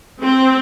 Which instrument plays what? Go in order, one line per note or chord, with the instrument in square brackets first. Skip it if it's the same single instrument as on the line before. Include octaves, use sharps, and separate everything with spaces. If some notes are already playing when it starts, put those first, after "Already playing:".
[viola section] C4